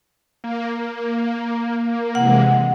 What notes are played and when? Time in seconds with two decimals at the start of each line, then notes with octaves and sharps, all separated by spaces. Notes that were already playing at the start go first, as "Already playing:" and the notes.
0.44 A#3
2.15 C3 E3 G#3 F#5